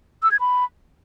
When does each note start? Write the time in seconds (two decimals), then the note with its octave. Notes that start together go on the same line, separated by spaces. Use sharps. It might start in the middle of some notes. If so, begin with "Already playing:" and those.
0.23 E6
0.31 G#6
0.40 B5